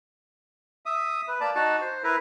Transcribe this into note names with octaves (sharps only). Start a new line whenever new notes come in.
E5 D#6
B4
A#3 D5 A5
D#4 F#4 A5
C5
E4 A#4 B4